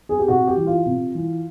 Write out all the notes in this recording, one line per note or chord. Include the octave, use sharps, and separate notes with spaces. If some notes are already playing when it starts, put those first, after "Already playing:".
G#4
G4
C3 F#4
G4
E3
F4
C3
E3